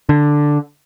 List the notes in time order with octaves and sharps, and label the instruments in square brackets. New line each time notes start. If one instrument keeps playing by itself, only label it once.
[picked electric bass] D3